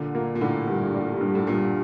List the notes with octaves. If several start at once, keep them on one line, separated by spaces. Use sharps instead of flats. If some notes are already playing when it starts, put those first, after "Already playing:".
Already playing: A#2 D3
A#2 A#3
A#2
A2 D3
G2
G3
G2
A2
G2 A#2